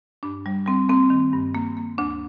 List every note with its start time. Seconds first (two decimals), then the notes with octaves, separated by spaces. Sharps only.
0.23 G2 D4
0.46 G3
0.66 G3 C4
0.89 A#3 C4
1.10 D#3
1.33 G2
1.54 A#3
1.77 A#3
1.98 D2 D4